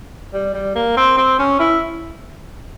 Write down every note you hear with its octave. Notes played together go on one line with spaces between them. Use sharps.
G3
G3
A#3
C4
C4
C#4
E4